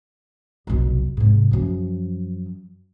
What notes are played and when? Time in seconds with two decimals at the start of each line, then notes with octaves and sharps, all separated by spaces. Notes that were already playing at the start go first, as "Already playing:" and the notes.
0.67 F1 B1
1.17 G#2 C3
1.51 F#2 F3